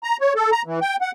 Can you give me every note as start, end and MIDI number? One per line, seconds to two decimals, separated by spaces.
0.03 0.17 82
0.21 0.33 73
0.36 0.50 69
0.52 0.62 82
0.66 0.80 52
0.81 0.96 79
1.01 1.11 78